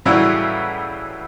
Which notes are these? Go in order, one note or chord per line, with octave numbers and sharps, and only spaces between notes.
A2 C#3 E3 F#3 G3 E4